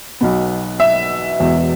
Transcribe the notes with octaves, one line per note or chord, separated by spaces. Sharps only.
B1 B2 B3
E5
E1 E2 B2